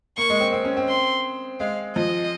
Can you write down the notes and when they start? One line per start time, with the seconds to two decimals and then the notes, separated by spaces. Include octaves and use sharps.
0.17 A#3 C#6
0.30 G#3
0.41 C4
0.53 C4
0.65 C#4
0.77 C4
0.89 C6
1.60 G#3 F5
1.96 F3 D#5